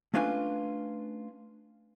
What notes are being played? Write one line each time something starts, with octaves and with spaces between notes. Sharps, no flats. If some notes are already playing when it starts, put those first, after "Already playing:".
A3 C#4 D4 F4 B4 G#5